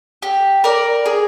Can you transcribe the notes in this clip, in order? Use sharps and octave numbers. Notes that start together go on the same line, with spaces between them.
G4
A#4 D5
G#4